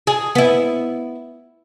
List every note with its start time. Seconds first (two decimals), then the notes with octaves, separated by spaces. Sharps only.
0.07 G#4
0.35 B3 E4